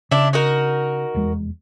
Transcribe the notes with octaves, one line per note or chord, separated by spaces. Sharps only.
C#3 D4 E4
D#4 F#4 A#4
F1 E2 G#3